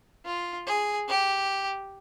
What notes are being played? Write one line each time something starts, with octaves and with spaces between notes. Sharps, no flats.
F4
G#4
G4